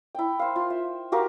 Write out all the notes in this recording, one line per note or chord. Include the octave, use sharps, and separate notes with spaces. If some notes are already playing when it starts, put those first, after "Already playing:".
E4 G5
C5 F5
F4
E5
F#4 G4 A#4 F5